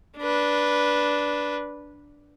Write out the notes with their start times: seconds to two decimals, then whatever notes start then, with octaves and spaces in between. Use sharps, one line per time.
0.18 D4 B4